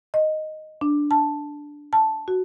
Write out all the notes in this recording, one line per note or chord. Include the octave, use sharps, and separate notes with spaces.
D#5
D4
A5
A5
F#4